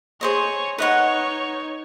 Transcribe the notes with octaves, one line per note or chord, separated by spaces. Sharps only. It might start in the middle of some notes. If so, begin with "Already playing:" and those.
G#4 C5 C#5 D#5
D#4 B4 C#5 D#5 F#5